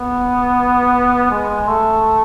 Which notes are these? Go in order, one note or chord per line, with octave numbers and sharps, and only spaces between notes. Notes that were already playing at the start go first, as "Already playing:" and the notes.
Already playing: B3
G#3
A3